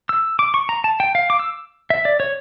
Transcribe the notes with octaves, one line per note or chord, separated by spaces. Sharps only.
E6
D6
C#6
A#5
A5
G5
F5
D6
E6
E5
D5
C#5